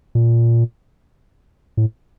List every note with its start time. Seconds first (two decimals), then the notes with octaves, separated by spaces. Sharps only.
0.15 A#2
1.77 A2